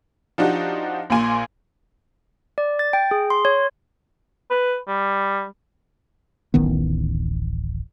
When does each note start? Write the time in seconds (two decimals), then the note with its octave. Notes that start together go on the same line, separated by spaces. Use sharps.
0.38 F3 D4 D#4 F#4 G4
1.10 A#1 A#2 A#3 G#5 C6
2.58 D5
2.79 A6
2.93 G5
3.11 G#4
3.30 C6
3.45 C#5
4.51 B4
4.88 G3
6.54 D1 A1 D#3 B3